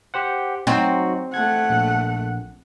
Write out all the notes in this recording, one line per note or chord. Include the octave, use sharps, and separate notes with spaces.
G4 C5 F#5
F#3 C4 D#4 F#4
A3 F#5 G#6
A#1